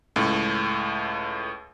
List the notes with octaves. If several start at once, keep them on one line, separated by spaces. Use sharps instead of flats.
C#2 A2